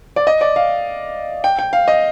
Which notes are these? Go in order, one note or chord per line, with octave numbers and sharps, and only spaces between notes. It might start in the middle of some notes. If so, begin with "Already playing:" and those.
D5
D#5
D5
F5
G5
G5
F5
D#5